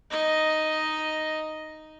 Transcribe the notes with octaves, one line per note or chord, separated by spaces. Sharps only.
D#4 D#5